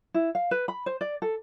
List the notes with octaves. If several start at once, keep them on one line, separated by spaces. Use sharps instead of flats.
E4
F5
B4
B5
C5
D5
A4